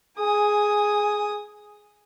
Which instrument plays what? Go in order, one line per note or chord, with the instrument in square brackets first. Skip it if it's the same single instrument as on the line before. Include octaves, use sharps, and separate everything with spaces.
[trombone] G#4 [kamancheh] G#5 D#6